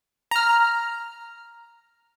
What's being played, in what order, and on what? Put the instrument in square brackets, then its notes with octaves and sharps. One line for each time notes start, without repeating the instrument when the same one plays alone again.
[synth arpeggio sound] A#5 F6